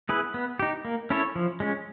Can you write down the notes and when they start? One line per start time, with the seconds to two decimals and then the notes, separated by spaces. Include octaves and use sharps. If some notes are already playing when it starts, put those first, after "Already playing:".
0.09 B3 E4 G#4 B4
0.34 B3
0.59 D#4 G4
0.85 A#3
1.10 C#4 E4 A4 C#5
1.35 F3
1.60 G#3 C#4